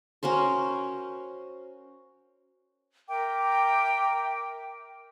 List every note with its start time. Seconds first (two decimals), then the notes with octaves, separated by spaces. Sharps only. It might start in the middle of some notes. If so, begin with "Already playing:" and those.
0.23 C#4 F#4 A#4 C5
3.08 A#4 E5 G5 D6